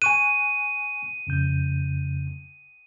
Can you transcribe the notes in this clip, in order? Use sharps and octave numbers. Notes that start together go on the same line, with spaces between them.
G#5 C#6 F#6 D#7
F2 C#3 G6